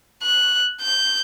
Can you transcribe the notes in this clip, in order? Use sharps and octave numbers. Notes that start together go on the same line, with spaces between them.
F#6
G6